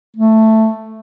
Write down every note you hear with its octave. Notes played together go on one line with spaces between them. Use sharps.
A3